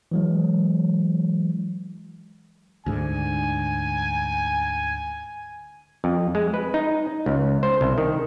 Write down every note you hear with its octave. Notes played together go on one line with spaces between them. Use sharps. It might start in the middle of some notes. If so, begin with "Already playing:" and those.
E3 F#3 G#3
D2 G#2 D3 G#5
F2
G#3
B4
D#4
C#2
C5
C2
D#3